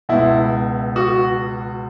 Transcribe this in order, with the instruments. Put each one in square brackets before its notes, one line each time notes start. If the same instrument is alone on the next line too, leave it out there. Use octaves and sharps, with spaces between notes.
[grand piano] C#2 B2 E4
F#4